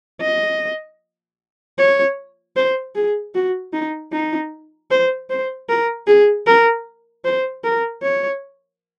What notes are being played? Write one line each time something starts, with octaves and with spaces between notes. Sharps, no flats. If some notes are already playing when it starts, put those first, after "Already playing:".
D#5
C#5
C5
G#4
F#4
D#4
D#4
C5
C5
A#4
G#4
A#4
C5
A#4
C#5